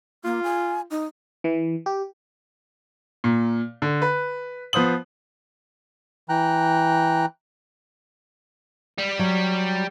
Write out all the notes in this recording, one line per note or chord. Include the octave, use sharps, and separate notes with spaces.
A#3 F4
G#5
D#4
E3
G4
A#2
D3
B4
F3 B3 C5 D#6 F#7
E3 G5 A#5 F#6
G3
F#3